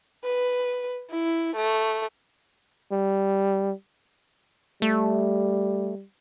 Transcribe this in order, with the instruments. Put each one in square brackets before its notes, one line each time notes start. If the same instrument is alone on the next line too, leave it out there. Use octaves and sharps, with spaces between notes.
[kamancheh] B4
E4
A3
[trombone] G3
[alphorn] G3 [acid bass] A3